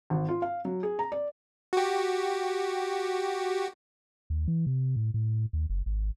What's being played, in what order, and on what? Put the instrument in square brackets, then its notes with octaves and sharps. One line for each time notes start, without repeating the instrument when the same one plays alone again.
[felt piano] G#1
F4
F5
F#3
G#4
A#5
D5
[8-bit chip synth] F#4 G4
[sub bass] D#2
E3
C3
A2
A2
D#2
F#1
G#1